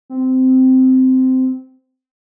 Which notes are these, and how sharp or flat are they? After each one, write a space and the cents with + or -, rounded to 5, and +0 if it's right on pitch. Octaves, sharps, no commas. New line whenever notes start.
C4 -15